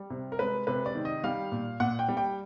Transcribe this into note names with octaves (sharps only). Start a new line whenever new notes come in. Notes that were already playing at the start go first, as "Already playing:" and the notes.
Already playing: G3
C3
A#4
G#3 B4
C3 B4
D5
D#3
D#5
G3 F5
A#2
A#2 F#5
G5
G3
G5